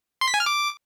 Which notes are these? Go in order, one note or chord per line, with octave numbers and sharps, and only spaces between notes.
C6
B6
G#5
F6
D6